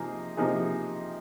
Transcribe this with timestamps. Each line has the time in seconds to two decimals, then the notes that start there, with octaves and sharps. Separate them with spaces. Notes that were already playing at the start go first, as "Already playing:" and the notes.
Already playing: C3 F3 A#3 D#4 G#4
0.37 C3 F3 A#3 D#4 G#4